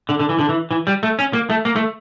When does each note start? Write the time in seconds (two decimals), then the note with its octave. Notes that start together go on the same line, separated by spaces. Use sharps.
0.09 D3
0.19 D3
0.29 E3
0.39 D3
0.49 E3
0.71 E3
0.87 G3
1.03 A3
1.19 C#4
1.33 A#3
1.50 A3
1.65 A#3
1.76 A3